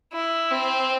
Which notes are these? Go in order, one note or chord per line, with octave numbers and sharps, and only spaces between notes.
E4
C4